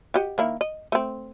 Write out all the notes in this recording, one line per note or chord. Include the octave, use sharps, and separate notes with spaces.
F#4 G4 D#5
D#3 A#3 E4
D#5
A3 C4